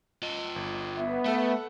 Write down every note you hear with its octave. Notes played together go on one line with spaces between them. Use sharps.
F4 D#5
G1
B3 E5
A3 A4 F#5